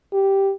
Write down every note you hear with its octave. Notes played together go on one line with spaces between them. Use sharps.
G4